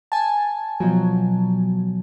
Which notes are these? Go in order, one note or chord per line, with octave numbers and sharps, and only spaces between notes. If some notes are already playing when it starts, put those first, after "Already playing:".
G#5 A5
B2 F3 F#3